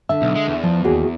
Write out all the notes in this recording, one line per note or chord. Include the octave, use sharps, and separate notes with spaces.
D3 E5 A5
B1
G#3
E2
F3
D#2 F#4 G#4